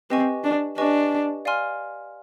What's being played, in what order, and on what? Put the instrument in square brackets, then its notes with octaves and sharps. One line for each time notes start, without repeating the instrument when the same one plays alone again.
[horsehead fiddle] C4 [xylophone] G4 B4 D#5 G#5 C#6
[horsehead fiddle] D4
[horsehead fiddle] D4 [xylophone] G4 B4 D#5 G#5 C#6
[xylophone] D5 F5 G#5 C6 F6